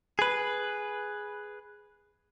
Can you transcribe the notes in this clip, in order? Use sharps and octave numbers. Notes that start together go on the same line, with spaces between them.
G#4 B4